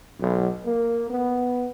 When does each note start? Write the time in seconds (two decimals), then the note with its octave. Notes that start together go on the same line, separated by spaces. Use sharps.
0.20 B1
0.64 A#3
1.09 B3